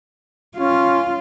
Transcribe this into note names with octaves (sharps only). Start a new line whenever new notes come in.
C#4 F4